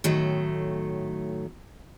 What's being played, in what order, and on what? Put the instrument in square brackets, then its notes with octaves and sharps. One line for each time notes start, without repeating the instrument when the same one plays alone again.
[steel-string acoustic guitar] A2 D#3 F#3 A3